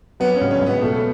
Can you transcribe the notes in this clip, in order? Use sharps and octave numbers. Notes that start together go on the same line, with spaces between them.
F#3 B3
C#4
C#2
C#4
C#2
B3
B2 A3